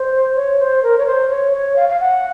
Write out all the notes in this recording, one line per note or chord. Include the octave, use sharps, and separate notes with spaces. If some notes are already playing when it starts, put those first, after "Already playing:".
Already playing: C5
C#5
C5
A#4
C#5
C5
C#5
C#5
F5
F5
F#5